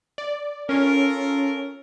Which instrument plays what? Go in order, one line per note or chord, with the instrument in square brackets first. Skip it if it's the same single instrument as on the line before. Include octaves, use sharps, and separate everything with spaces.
[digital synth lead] D5
[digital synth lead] C#4 [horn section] F4 A4 A#4